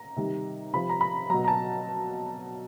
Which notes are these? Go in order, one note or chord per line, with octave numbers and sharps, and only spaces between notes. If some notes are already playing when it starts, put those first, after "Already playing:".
Already playing: A#5
C3 D#3 G3
C3 F3 B5
A#5
B5
B2 F#3 A#5
A#5
A5